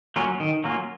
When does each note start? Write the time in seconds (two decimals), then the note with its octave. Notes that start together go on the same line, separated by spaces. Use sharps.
0.16 F#3 A#3 C#4 F4
0.40 D#3
0.64 F#3 A#3 C#4 F4